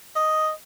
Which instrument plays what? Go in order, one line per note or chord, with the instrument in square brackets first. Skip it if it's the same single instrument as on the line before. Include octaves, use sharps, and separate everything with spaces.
[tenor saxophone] D#5